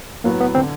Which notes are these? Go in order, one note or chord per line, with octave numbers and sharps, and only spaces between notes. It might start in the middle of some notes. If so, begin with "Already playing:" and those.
A2 F#3 A#3 B3
B3
D3 C4